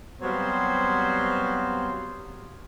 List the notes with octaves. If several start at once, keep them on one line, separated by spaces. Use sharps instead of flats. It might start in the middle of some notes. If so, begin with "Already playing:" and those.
F#3 G3 B3 C4 C5 F5